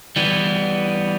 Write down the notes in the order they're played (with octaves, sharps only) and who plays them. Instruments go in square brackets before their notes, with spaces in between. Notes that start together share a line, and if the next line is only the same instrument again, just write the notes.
[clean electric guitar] E3 G3 B3